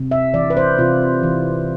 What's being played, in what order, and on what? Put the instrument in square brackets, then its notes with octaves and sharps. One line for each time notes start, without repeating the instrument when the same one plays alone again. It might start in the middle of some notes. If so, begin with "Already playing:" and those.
Already playing: [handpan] C3
E5
E3 D5
B4
C5
C3 F4
E3